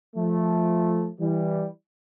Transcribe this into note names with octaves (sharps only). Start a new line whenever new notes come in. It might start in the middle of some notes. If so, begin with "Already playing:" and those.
F3 A3
E3 G3